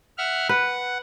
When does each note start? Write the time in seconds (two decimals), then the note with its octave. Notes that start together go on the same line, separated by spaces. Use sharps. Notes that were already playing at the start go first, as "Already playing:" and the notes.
0.18 E5 F#5 F6
0.49 B4 F#5